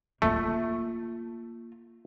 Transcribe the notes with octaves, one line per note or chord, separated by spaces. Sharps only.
A3 A#3 F4